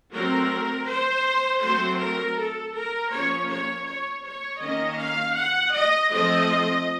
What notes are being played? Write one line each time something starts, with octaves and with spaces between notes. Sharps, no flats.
F#3 A3 C4 A#4
C5
F#3 A3 C4 C5
A#4
A4
A#4
F3 A#3 C#4 C#5
C#5
C#5
C#5
D#3 A#3 C#4 D#5
F5
F#5
D#5
F3 A3 C4 D#5